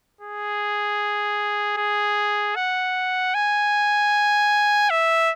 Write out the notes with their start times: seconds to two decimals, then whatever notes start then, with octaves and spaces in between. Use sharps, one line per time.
0.21 G#4
1.77 G#4
2.56 F#5
3.34 G#5
4.90 E5